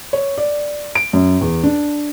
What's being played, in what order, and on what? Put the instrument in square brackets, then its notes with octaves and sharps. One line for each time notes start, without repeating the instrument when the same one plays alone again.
[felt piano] C#5
D5
D7
F#2
E2
D4